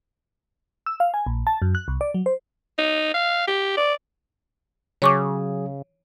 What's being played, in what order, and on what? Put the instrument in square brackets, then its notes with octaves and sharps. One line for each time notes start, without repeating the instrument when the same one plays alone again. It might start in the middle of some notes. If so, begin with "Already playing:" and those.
[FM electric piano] E6
F5
G#5
A#1
A5
F#2
F#6
C2
D5
F#3
C5
[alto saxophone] D#4
F5
G4
D5
[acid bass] C#3 [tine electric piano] F#3 G#4 [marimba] C#5 C#6 D6